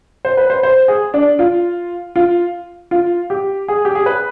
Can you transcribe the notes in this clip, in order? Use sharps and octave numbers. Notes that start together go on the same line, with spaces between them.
C5
B4
C5
C5
G#4
D4
F4
F4
F4
G4
G#4
G4
G#4
B4